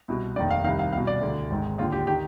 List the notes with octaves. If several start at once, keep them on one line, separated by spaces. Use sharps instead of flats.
C2 B2
F1 D#2 D#3 D5
F5
C2 C3 D#3 F5
F5
C2 B2 F5
D5
D2 D3
G#1 G#2 D#3
D#2 D3 F4
G4
D#3 G4